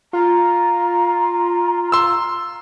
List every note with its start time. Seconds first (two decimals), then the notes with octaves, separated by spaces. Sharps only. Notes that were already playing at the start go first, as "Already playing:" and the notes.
0.13 F4 A#5
1.92 C6 E6